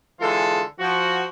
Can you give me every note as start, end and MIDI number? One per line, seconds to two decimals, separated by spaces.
0.20 0.63 50
0.20 0.63 52
0.20 0.63 56
0.20 0.63 65
0.20 0.63 68
0.20 0.63 69
0.80 1.24 53
0.80 1.24 66